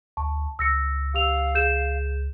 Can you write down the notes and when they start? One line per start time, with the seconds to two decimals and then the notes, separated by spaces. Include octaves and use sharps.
0.17 D2 A5 C#6
0.59 C#2 E6 A#6 C#7
1.14 G4 F5 E6 F7
1.55 G#4 G6 E7